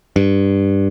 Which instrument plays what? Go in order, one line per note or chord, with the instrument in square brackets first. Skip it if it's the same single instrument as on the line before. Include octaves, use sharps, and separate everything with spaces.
[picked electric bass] G2